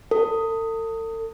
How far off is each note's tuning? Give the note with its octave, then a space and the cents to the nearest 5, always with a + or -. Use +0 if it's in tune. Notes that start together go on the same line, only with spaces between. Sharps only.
A4 +40